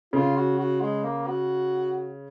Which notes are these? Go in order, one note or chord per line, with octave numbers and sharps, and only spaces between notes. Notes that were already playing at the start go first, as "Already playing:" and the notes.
C#3 F4
F#4
F#4
G#3
A#3
F#4